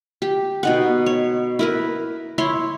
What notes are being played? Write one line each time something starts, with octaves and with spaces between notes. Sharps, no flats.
G4
B2 D#4 F#5
C#5
E4 A#4 B4
E4 C#5 C6